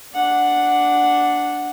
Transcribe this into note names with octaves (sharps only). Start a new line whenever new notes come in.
D4 F#5